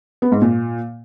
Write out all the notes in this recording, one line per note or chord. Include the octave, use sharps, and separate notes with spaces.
B3
G#2
A#2